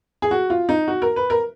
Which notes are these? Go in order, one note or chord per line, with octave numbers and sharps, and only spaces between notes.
G#4
F#4
F4
D#4
F#4
A#4
B4
A#4